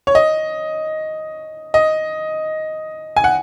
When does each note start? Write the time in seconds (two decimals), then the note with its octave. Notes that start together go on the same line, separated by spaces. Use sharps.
0.07 C#5
0.15 D#5
1.74 D#5
3.16 G#5
3.24 F#5